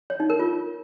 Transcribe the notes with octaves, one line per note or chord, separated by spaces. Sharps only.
C#5
D#4
A#4
F4